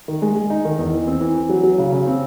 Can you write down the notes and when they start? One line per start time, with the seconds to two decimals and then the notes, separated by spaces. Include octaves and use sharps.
0.08 D#3
0.22 G#3
0.35 G#3
0.50 D#4
0.65 D#3
0.79 E2
0.93 E3
1.07 C4
1.20 E3
1.35 E3
1.49 F#3
1.63 F#3
1.78 C#3
1.92 C#3
2.07 C4